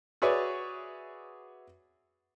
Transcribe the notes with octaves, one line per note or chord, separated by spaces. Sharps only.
F#4 G#4 B4 C#5 D5 E5